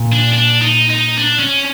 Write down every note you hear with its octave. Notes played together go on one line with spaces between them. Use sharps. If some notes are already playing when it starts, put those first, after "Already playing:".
Already playing: A#2
D4
D4
D#4
D#4
D4
C#4